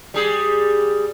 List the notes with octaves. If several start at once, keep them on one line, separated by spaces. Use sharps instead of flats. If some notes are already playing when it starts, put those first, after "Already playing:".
G3 G#4